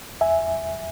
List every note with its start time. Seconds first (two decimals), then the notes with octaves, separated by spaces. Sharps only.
0.21 E2 E5 G#5